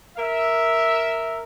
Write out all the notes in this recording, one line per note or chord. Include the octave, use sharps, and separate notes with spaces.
A#4 E5